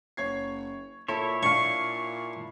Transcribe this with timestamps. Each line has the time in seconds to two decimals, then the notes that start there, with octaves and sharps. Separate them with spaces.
0.17 F#1 C#5 G#6 C7
1.08 A#2 E4 A4 C#5
1.43 D4 F5 C#6